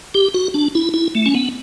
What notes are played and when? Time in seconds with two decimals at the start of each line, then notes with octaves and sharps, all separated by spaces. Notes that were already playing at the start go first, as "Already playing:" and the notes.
0.14 G4
0.34 F#4
0.54 D4
0.75 E4
0.94 E4
1.15 A3
1.26 C#4
1.35 B3